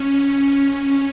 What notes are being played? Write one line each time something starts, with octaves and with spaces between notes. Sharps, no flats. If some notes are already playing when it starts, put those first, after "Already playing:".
Already playing: C#4
C#4